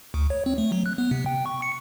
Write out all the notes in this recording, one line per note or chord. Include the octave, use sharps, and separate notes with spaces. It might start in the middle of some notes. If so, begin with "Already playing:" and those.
D2
C#5
C4
A3
F#3
F#6
B3
C3
G5
C#6
C#7